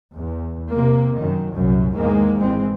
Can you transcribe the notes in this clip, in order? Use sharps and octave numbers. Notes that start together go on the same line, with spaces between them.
E2
C3 A#3
F#2 D#3
C2 F#2 A#2 F#3
E2 G#2 D#3 G#3 A#3
G#1 E3 G#3 C4